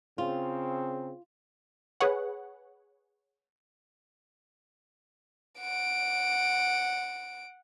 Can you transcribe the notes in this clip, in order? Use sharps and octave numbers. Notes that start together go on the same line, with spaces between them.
C#3 C4 F4
G#4 B4 C#5 F#5
F#5 D7